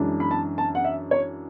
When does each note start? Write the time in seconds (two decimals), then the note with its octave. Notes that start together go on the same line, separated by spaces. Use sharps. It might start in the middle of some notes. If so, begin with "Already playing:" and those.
Already playing: F#2 E3 G#3 D4
0.20 B5
0.31 A5
0.58 A5
0.75 F#5
0.84 E5
1.11 C#5